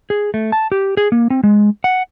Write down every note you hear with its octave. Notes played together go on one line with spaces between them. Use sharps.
G#4
A3
A5
G4
G#4
A#3
C4
G#3
F#5